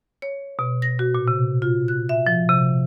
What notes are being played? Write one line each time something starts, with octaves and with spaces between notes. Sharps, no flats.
C#5
B2
A#6
F#4
A#2
C3
F4
F#6
E5
F3
C3